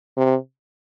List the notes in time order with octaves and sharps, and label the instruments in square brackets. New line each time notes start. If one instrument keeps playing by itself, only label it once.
[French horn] C3